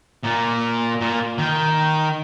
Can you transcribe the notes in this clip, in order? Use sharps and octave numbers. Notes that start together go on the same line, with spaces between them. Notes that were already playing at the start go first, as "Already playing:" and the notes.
A#2
A#2
D#3